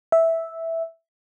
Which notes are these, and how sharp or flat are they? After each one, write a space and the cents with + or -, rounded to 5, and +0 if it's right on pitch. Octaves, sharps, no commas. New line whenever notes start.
E5 -5